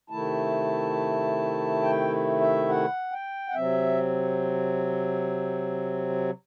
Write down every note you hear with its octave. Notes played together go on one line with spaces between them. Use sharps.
C3 D#3 A3 E4 A5
G5
E5
F#5
G5
F#5
C3 F#3 C4 E5